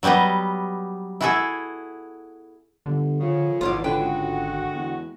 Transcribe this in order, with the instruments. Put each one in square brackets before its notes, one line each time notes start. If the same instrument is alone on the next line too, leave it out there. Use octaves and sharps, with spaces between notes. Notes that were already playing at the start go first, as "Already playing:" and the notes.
[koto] F#3 G3 B3 G4 D#5
E4 F#4 G#4 A4 E5
[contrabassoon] G1 [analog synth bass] D3
[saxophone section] A2 C#3 [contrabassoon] F3
[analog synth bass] G#1 [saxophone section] E2 G#2 B2 [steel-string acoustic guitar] F4 C#5 D5
[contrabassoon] C#2 [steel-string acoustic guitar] D3 G5 [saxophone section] D4 F#4 B4
[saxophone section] G#3 F#4
[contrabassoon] E2